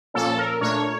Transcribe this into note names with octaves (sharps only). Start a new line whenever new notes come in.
A#2 F3 A#3 C#4 A4
A#4
A#2 A3 D4 C#5